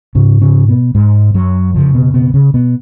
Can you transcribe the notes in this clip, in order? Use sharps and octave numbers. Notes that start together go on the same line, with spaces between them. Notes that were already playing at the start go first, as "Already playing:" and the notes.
G#2 C#3 C#4
C#3 C#4
B2 B3
G#2 G#3
F#2 F#3
F2 C#3 F3
B2 B3
B2 B3
C#3 C#4
B2 B3